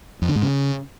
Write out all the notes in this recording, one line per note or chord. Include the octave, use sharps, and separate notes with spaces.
F2
D3
G#2
C#3